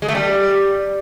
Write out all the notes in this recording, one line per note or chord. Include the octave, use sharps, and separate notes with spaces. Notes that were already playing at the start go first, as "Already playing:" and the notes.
G#3
A3
G3